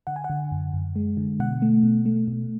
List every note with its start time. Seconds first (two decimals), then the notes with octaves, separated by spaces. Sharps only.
0.07 D3 F#5
0.16 G#5
0.24 F#5
0.30 D3
0.52 F#2
0.73 F#2
0.96 G#3
1.17 D3
1.40 B2 F#5
1.62 A3
1.83 B2
2.05 A3
2.28 B2